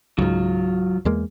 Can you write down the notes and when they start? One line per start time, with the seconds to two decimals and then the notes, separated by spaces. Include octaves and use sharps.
0.19 C#2 G#2 F#3 F4
1.05 E2 G#3 A#3